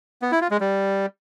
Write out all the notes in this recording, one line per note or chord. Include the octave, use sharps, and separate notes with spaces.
B3
E4
F4
G#3
G3